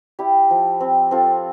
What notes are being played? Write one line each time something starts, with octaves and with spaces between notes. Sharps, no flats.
E4 G4
F3
C4
C4 F4 A4